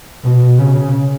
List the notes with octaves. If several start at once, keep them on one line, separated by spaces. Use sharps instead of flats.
B2
C#3